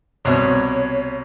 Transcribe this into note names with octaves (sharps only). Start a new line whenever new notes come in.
C2 B2 C#5